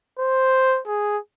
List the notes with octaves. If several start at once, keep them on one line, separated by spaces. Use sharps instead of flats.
C5
G#4